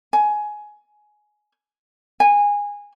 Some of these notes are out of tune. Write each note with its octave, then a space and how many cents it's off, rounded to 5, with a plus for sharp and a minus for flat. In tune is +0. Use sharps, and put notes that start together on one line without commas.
G#5 +15
G#5 -20